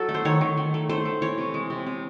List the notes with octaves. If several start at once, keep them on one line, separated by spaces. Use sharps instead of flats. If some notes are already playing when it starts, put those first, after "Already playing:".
Already playing: F#3 A4
A3
C5
D#3 C#5
D#3
D#3
A3
A3 C5
A3
E3 C#5
C3
G#3
C3
C3